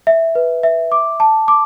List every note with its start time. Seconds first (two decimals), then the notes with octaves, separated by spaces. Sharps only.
0.07 E5
0.35 B4
0.63 E5
0.92 D6
1.20 A5
1.48 D6